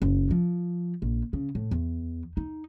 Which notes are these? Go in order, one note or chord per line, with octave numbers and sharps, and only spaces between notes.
F#1
F3
A#1
C#3
A2
E2
D#4